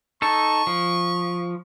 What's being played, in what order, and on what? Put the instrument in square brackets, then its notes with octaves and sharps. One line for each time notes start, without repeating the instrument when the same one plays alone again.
[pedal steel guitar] D#4 A4 [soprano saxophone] C#6
[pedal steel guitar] F3